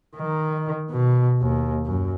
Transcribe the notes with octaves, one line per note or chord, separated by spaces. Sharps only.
D#3
B2
D#2
F#2